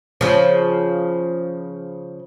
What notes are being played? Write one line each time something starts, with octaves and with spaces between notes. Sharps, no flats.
C#3 F3